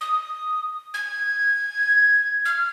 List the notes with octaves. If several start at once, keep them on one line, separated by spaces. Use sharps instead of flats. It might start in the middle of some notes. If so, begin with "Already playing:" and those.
D#6
G#6
F6